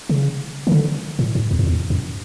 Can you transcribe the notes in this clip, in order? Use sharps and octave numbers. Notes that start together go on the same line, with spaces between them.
C#3
D#3
D3
A2
G2
E2
F2
E2
F#2